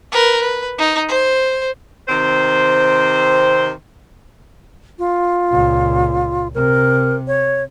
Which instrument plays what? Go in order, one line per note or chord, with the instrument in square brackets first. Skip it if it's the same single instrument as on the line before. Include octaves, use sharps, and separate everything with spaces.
[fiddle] A#4 B4
B4
D#4
C5
[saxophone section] C3 D#3 C4 C5
[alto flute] F4
[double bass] C#2 A#2
[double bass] C3 [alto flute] A#4
[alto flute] C#5